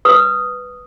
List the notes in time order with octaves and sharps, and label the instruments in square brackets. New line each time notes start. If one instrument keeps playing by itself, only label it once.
[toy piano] B4 D#6